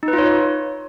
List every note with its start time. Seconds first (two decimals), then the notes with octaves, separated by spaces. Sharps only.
0.03 D#4
0.08 B4
0.13 F4
0.18 C#5